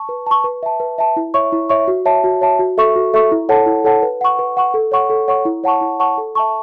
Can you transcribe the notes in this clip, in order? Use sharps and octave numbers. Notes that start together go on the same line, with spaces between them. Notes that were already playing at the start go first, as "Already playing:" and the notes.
Already playing: A5 C#6
B4
A5 C#6
B4
E5 A5
B4
E5 A5
E4
C#5 E5 C#6
E4
C#5 E5 C#6
F#4
C#5 E5 A5
F#4
C#5 E5 A5
F#4
A4 E5 C#6
F#4
A4 E5 C#6
E4
A4 C#5 F#5 A5
E4
A4 C#5 F#5 A5
B4
F#5 C#6
B4
F#5 C#6
A4
C#5 F#5 C#6
A4
C#5 F#5 C#6
E4
C#5 F#5 A5 C#6
E4
C#5 F#5 A5 C#6
A4
E5 A5 C#6